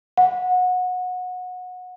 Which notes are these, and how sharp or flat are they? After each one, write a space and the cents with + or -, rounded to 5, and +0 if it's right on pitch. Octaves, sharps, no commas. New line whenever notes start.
F#5 -20